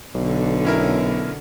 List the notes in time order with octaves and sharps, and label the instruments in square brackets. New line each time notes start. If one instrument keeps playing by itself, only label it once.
[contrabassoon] B1 [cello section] B2 D3
[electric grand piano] C#4 E4 A#4